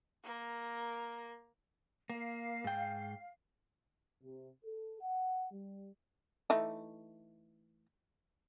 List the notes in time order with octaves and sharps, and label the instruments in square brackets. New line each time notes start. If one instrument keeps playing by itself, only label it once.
[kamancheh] A#3 A#4
[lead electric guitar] A#3 [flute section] F5
[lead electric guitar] G#2 G5
[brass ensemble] C3
A4
F#5
G3
[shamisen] E3 A3 D#4